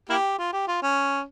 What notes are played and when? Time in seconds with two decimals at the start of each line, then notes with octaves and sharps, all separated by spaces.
0.09 A#3 E4 G4
0.38 F4
0.53 G4
0.67 F4
0.82 C#4